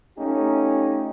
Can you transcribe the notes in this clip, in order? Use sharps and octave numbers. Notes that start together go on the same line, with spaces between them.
A3 C#4 D#4 F4 G4